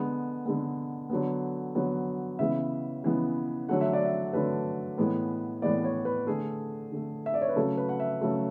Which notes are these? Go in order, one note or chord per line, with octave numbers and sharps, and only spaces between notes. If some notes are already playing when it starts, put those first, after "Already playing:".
Already playing: D3 G#3 B3
D3 G#3 B3
D3 F#3 B3
D3 F#3 B3
C#3 E3 G#3 B3 E5
C#3 E3 G#3 B3
D3 F#3 A3 F#5
E5
D5
E5
D3 F#3 A3 B4
A2 E3 G#3 B3
A2 E3 G#3 B3 D5
C#5
B4
D3 A3 G#4
D3 A3
E5
D5
C#5
B4
C#3 F#3 A3 A4
B4
F#5
E5
C#3 F#3 A3